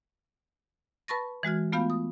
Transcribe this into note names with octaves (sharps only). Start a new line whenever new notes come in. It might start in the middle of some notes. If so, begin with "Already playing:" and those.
B4 A5 B5 C#6 A6 A#6
E3 G#3 F#4 F6
A3 B3 F4 F5 B5 G6
D#6